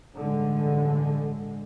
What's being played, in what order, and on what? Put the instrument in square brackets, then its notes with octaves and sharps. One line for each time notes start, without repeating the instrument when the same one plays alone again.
[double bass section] A1 G2 D3 G#3